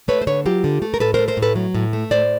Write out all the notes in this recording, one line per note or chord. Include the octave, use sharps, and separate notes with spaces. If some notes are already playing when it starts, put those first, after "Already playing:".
A3 B4 C#5
C5
D3 B4 C#5
F#3 F4 G4
D3
A3
A#4
A2 A4 B4
A#4 C5
A3
A#4 C5
A2
A4 B4
F#3
A2
A3
A2 C5 D5